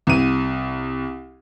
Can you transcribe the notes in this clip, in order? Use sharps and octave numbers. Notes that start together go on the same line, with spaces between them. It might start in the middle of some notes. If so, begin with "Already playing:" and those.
C2 D#7